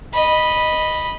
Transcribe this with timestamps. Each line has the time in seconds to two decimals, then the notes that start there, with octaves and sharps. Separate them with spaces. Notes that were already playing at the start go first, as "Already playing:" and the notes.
0.13 D#5 B5